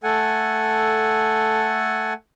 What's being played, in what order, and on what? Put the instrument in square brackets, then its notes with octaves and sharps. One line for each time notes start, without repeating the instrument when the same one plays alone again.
[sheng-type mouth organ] A3 A4 F#5 G#5